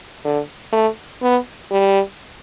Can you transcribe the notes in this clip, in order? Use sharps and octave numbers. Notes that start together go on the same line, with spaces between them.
D3
A3
B3
G3